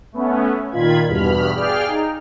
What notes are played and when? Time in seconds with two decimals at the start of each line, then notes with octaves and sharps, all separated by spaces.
0.12 A3 B3 C#4
0.71 A#2 D#3 F4 B5 G#6
1.07 E2 G2 B2 B5 F6
1.54 G#4 D5 F5 G5 F6
1.88 D#4